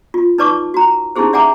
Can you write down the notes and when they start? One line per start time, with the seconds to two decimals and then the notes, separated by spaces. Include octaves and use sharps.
0.14 F4
0.38 D#4 B4 D5 A5 C#6 D6
0.74 F#4 A#5
1.16 C#4 D#4 E4 G4 G#4 C5
1.33 D5 E5 F#5 G#5 A#5 D6